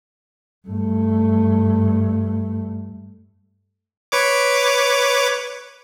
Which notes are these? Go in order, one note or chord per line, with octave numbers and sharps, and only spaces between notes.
G2 A3
B4 C#5 D6